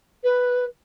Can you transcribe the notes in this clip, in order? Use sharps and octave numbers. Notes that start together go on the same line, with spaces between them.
B4